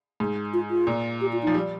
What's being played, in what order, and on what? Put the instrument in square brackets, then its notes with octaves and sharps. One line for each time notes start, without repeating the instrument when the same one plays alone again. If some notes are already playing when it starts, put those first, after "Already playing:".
[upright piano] G#2
[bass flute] F4
F4
[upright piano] A#2
[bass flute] G4
F4
[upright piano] F3 [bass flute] D#4
[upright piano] G3